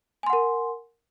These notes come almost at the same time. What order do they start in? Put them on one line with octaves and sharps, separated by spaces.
G#5 C6 F#5 A#4